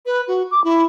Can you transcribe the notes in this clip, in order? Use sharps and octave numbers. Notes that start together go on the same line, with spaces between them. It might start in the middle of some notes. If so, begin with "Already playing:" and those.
B4
F#4
D6
E4